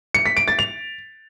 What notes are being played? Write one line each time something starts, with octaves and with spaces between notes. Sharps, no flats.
C#7
B6
D7
A6
F7